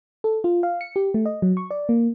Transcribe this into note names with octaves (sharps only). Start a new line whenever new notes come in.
A4
F4
F5
C#7
G4
A3
D#5
F#3
C#6
D5
A#3